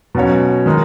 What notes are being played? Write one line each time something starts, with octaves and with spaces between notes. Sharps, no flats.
B2 F#3 C#4 F#4 C#5
D#3 G#3 D#4